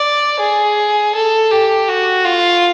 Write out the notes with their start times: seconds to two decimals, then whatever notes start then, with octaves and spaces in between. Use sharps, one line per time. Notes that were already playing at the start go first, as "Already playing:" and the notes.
Already playing: D5
0.40 G#4
1.15 A4
1.51 G4
1.88 F#4
2.25 F4